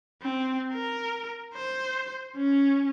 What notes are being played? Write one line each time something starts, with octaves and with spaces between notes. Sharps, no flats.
C4
A#4
C5
C#4